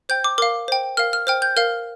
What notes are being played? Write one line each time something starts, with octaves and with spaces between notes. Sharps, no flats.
C5 G5 G6
D6
A#4 F5 D6
C5 G5
A#4 F5 F6
F6
C5 G5 F6
G6
A#4 F5 F6